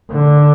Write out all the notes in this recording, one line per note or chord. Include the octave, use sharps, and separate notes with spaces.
D3